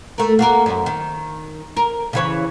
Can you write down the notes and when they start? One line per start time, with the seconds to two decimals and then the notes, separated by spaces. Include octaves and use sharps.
0.18 A3 A#4
0.39 A#3 F#4 A#4
0.66 F#2
0.86 D#3
1.77 A#4
2.13 C#3 E3 C#5